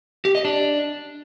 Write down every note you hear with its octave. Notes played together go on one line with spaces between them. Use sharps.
G4
D#5
D4